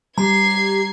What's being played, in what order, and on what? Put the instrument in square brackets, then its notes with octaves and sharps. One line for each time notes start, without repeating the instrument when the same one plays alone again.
[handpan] G3 [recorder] G4 [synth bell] A#5 [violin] G#6 C7